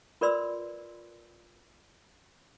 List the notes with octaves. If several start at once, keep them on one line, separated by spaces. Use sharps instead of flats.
F4 A#4 B4 D5 C6 E6